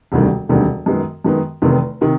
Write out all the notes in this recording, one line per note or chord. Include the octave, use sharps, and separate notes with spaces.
E1 D2 C3 D#3 G3
E1 D2 C3 D#3 G3
F#2 D#3 G#3 B3
F#2 D#3 G#3 B3
F1 E2 C3 D#3
C3 D#3